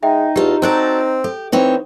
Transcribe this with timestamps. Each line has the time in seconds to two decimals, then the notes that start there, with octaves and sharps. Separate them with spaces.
0.03 G#3 D#4 E5 G5
0.36 E2 F4 G4 A4
0.62 C4 F#4 A4 D5 A#5 F#6
1.24 G4 A4
1.52 E3 C4 D#4 C#5